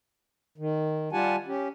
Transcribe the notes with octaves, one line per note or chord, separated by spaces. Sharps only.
D#3
G3 F4 G4 F#5 G#5 A5
C#4 G4